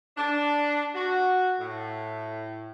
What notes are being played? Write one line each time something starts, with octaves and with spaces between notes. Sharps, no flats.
D4
F#4
A2